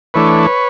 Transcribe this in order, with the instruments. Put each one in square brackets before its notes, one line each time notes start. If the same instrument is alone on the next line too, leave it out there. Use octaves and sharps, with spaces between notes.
[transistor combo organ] E3 A3 D4 B4 C#5